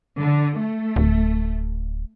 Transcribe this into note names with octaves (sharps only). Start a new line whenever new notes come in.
D3
A3
D1